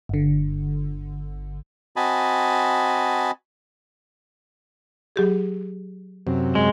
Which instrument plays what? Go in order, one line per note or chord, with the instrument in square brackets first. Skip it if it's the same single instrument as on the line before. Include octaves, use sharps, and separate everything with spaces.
[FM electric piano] G1 D3
[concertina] C4 F#4 D#5 G#5 A5 B5
[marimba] F#3 G4 G#4
[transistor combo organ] F#2 C3
[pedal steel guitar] G#3